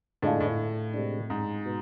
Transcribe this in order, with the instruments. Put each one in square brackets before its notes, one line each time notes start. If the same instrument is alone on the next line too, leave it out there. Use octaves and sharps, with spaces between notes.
[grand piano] A2 [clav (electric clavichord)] D3 G#3 D4 F4
[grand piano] A2
[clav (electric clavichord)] C3 G#3 D4
[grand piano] G#2
[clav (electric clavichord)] B2